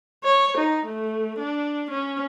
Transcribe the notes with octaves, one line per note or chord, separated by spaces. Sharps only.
C#5
D#4
A3
D4
C#4